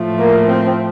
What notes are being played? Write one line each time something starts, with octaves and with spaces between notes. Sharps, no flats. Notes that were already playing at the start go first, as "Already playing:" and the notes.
Already playing: A2 F3 A3
A#3
C4